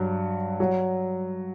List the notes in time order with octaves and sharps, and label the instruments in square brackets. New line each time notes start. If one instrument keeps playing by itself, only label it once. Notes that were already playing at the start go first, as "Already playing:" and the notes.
Already playing: [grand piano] G2 F#3
F#3